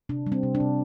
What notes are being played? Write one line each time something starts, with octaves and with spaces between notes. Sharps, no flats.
C3 D4
G3
C4
C3
D4
C3